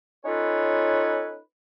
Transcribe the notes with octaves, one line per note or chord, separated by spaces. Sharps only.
C#4 D#4 F4 A4 B4 C#5